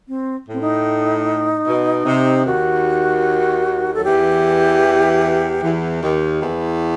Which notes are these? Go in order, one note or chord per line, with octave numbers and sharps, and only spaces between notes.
C4
A2
C4
D#4
B2
C3
D#2 D#3 F#4
F#3 A4
E2 E3 G4
E2 E3
D#2 D#3
E2 E3